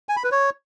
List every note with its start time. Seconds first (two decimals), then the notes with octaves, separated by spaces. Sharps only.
0.09 G#5
0.16 B5
0.24 B4
0.32 C#5